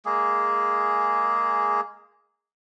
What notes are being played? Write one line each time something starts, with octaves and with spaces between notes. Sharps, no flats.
G#3 A#3 G#4